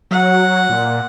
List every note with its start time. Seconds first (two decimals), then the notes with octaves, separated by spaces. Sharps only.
0.11 F#3 F#5
0.70 A#2